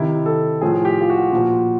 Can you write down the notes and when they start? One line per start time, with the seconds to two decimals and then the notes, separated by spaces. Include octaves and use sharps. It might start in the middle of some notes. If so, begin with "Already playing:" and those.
Already playing: C3 D#3 E4
0.26 A4
0.61 A2 F3 G#4
0.85 G4
1.01 F4
1.10 F#4
1.32 A#2 F3